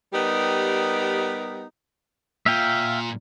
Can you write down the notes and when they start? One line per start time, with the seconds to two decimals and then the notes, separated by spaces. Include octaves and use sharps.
0.13 G3 B3 D#4 G4 A#4
2.46 A#2 E5 F5 G5